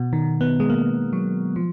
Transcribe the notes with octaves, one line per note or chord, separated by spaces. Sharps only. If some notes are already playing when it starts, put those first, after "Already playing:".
Already playing: B2
D#3
B3
G#3
A#3
F#3
F3